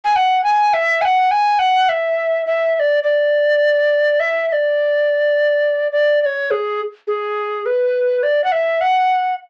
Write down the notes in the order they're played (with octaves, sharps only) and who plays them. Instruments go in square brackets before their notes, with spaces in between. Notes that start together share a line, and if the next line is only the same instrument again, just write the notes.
[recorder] G#5
F#5
G#5
E5
G#5
F#5
G#5
F#5
E5
E5
E5
D5
D5
E5
E5
D5
D5
D5
C#5
G#4
G#4
B4
D5
F#5
E5
F#5